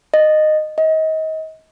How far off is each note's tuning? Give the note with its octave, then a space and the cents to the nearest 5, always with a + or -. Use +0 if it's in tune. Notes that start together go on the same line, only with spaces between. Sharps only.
D#5 -15
D#5 +30